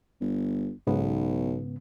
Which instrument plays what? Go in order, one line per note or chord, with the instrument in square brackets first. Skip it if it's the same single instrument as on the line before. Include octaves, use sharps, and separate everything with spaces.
[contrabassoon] G1
[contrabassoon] B1 [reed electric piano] G#2 C#3 B3